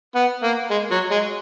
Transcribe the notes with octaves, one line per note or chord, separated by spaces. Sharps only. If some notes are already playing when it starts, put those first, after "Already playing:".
B3
A#3
G#3
F#3
G#3